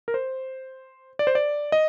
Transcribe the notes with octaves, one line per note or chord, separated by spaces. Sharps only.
A#4
C5
D5
C5
D5
D#5